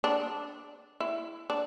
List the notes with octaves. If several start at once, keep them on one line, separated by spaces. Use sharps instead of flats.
D4
E4
D4